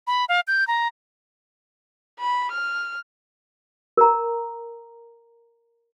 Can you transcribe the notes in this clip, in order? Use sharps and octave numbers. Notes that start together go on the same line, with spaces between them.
B5
F5
G6
A#5
B5
F6
A#4 A#5